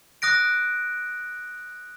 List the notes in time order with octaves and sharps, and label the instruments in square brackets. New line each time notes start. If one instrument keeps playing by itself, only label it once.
[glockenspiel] D#6 F#6 A#6 D7